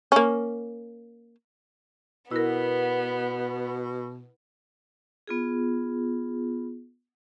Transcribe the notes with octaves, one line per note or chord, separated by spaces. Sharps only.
A#3 C#4
B2 B3 E4 A#4
B3 F4 G#4